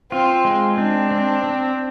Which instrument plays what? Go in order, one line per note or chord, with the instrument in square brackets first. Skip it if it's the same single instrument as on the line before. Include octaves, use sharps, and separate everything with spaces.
[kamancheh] C4 [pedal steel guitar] F4
[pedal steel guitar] G#3
[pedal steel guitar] C4 [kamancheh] D4
[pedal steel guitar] C4
C4